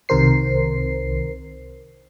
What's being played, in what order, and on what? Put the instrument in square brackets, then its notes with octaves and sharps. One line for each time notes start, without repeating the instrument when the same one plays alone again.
[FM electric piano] C2 C3 D#3 A#4 C5 C7